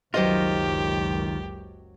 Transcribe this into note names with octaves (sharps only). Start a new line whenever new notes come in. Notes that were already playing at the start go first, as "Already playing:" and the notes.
F#1 C#2 D#3 F#3 F4 G4 C5 D#5